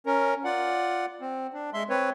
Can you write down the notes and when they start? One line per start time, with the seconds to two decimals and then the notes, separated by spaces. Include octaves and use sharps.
0.06 C#4 A#4
0.44 F4 D5 F#5
1.21 C4
1.54 D4
1.74 G#3 E5 C6
1.90 C4 B4 C#5